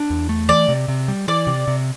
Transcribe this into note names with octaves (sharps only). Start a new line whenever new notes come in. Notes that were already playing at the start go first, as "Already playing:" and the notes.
Already playing: D4
E2
A3
E3 D5
C3
C3
G3
E3 D5
C3
C3